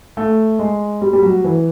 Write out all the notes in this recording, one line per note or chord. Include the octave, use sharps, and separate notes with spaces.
A3
G#3
G3
G3
F#3
E3